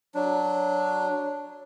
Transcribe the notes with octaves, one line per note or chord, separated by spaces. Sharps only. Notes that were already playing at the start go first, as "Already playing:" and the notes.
F#3 D4